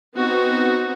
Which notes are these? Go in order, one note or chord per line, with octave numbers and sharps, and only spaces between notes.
B3 C4 D#4 F#4